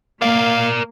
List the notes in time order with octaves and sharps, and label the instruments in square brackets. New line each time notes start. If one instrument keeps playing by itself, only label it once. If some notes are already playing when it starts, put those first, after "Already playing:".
[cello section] A#3 [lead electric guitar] A#4 D5 [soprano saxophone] F5